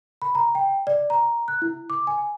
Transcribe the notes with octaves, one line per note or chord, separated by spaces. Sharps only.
B5
A#5
G5
D5
A#5
F#6
E4
D6
G#5